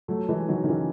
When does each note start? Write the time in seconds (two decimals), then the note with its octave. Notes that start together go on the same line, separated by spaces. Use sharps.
0.08 F#3 A3
0.29 E3 G#3
0.48 D#3 F#3
0.64 D#3
0.68 C#3 E3